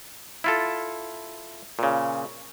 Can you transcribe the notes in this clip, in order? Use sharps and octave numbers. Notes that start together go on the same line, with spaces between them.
E4 F4 A4
A#2 C#3